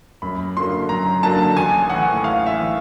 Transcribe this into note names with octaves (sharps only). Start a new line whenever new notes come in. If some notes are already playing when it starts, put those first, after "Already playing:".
F#2 B5
D3 F#3 A#3 C6
F#2 A#5
D3 F#3 A#3 A5
A1 G#5
A2 F#5
E3
A1 F5
E5
A2 E3